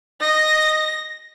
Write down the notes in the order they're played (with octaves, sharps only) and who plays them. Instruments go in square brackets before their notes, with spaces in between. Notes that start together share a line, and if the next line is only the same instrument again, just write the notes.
[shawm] D#5 [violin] A#6